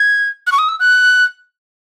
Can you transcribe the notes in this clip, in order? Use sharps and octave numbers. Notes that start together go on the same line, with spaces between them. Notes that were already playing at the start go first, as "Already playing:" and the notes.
Already playing: G#6
F#6
C#6
D#6
E6
F#6